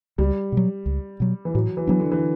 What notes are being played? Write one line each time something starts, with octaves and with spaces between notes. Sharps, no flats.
C#2 G3
B2 F#3
C#2
B2 F#3
E3
A2 F#3
E3
E3 F#3 B3 D4
D3
E3